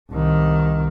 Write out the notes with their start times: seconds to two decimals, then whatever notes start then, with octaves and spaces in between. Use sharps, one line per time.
0.11 C2 D#3